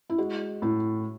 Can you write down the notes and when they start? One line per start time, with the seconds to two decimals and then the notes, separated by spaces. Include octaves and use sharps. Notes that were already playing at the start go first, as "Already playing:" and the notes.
0.10 E4
0.18 G#3 F#4
0.62 A2 E4